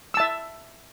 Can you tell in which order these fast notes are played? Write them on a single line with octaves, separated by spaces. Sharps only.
E6 A5 E5